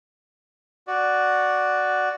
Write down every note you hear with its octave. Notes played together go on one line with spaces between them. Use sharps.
F#4 D5